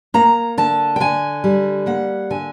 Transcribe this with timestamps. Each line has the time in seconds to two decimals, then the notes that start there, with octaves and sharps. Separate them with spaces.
0.14 A#3 A#5
0.58 D3 A5
0.96 G5
1.00 D3 G#5
1.44 G3
1.86 A#3 F#5
2.30 D3 G#5